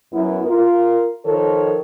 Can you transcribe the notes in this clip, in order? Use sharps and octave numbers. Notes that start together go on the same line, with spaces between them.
F#2 F#3 B3 E4
F4 A#4
D#3 F3 A4 A#4 C#5